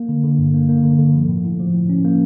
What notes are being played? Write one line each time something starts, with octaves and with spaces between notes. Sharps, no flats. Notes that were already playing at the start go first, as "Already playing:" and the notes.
Already playing: A#3
D3
D3
G2
A#3
A#3
D3
D3
F3
A2
A2
F3
A2
C#4
A#3